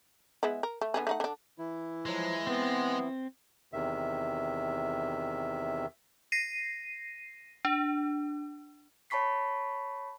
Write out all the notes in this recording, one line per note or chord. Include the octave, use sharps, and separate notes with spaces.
G#3 B3 E4
A#4
A3
D3 B3 G#4
A3 D#4 F#5
D3 D4
E3 E4
F3 F#3 G#3
B3 C4
E2 C3 D#3 E5
A#6 C7 D#7
D4
C#5 A5 B5 C#6 B6 C7